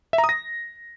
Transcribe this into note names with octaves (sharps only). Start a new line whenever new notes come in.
E5
A#5
D#6
A#6